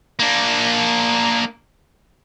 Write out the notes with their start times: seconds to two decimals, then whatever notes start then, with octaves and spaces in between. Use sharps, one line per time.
0.19 A#3 D4